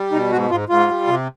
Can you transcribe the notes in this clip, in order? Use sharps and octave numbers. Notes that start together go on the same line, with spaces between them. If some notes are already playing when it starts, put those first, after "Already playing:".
Already playing: G3
B2 D#4
G#2 F#4
G#2 F4
G#2 F4
G3
C3